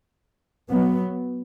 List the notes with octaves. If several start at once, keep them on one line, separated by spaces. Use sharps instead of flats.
F#3 B3